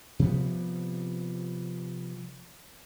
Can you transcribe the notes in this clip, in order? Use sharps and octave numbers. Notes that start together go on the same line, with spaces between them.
C3 F3 G3 B3